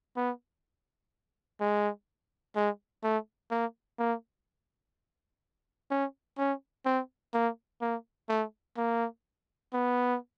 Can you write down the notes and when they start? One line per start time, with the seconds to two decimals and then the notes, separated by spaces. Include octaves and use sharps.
0.16 B3
1.60 G#3
2.56 G#3
3.03 A3
3.51 A#3
3.99 A#3
5.90 C#4
6.38 C#4
6.85 C4
7.34 A#3
7.81 A#3
8.29 A3
8.77 A#3
9.73 B3